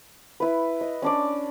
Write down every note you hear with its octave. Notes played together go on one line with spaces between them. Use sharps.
E4 B4
D#5
C#4 D4 D5